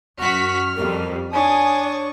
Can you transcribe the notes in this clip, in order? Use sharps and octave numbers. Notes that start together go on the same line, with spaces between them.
F#2 F#4 C#6 F6 B6
F2 G3 A#4
D4 C#5 G#5 C#6 D#6